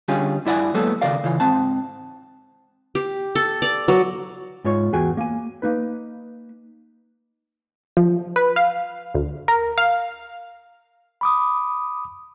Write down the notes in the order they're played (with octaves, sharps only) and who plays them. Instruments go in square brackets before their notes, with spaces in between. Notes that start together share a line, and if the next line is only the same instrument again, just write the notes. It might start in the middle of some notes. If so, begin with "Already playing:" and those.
[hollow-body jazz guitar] D3 G3 C#4 F4 G#4
G2 E4 D5 F#5 G#5
F#3 G#3 A#3 B3 A4 C5
D#2 C#3 A#4 D5 F5
C#3 E3 F4
G#2 C4 A5
[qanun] G4
A4
D5
F#3
[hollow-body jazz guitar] G#2 F4 C#5
E2 F#4 G#4 G5 G#5
A#3 G#5
A#3 D#4 B4
[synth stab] F3
B4
F5
D2
A#4
F5
[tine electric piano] B5 D6 D#6